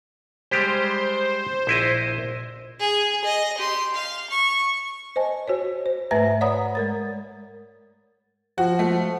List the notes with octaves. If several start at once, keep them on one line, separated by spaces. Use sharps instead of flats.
G3 G#3 G4 C5
A#1 E4 D#5
G#4
D#5
G4 C6
F5
C#6
C5 D#5 G#5 A5
F#4 C5 C#5
C5
G#2 A3 B4 E5 A#5 A#6
C#5 D5 F#5 A#5 B5 D#6
G#3 A#4 A6
F3 F#4
A3